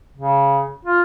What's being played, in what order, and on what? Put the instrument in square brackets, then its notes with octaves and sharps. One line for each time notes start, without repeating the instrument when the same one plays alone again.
[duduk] C#3
F4